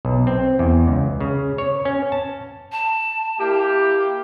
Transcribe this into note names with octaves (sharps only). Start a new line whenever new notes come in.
B1
C4
E2
C#2
C#3
C#5
C#4
A5
A5
A#3 E4 G4